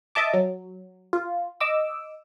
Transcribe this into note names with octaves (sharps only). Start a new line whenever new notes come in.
D#5 E5 A5 D6
F#3
F4
D#5 D6 E6